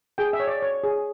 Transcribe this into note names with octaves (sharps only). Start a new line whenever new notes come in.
G#4 G5
E5
C#5
D5
C#5
G#4